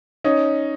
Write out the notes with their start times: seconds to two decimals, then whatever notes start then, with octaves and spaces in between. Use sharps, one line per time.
0.24 C#4 D#4